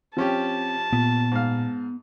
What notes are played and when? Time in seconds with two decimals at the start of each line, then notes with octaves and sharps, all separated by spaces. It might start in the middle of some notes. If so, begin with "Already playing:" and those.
0.17 F3 C4 C#4 G4 A5
0.93 A#2 B3
1.32 G#2 F5